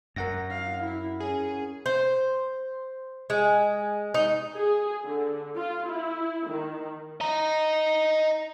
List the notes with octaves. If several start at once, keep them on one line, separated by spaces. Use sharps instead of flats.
F#2 A#4 F#5 A#6
F5
E4
C#4 G#4
C5
G#3
D#4
G#4
D3
F4
E4
D#3
D#5 A#5